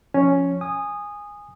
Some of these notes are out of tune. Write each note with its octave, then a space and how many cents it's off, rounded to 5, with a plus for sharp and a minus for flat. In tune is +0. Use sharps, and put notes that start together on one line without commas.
F3 +0 C#4 +0
G#5 -10 D#6 -10